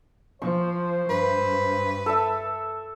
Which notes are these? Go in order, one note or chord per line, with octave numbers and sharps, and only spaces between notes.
F3 C5 C#6
G2 B4
A4 E5